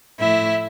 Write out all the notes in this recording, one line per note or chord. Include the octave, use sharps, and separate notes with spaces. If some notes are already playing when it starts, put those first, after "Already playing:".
A2 F3 A3 E4 E5